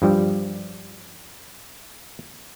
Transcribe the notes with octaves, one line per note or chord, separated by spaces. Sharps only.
G2 F3 G3